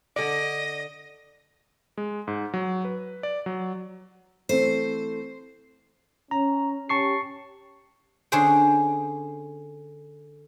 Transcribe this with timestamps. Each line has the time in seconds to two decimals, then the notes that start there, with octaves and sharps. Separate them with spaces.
0.16 D3 D5 D#5 F#5 A#6
1.98 G#3
2.28 G#2
2.54 F#3
2.85 B4
3.23 D5
3.46 F#3
4.49 E3 A3 C4 C5
6.31 C#4 A#5
6.89 C#4 G4 A5 C#6 C7
8.32 D3 C#4 G#4 C5 G5